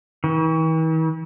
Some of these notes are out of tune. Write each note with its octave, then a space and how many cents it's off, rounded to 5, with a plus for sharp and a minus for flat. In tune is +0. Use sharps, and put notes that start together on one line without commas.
E3 -45